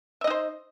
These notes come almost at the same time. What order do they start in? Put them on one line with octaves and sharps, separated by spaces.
E5 D#5 D#4 C5